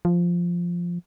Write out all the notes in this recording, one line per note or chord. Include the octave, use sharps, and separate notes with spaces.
F3